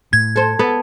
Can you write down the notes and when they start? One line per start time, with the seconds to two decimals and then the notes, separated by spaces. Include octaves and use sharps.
0.13 A2 G#6
0.36 A4 C5
0.59 B3 A4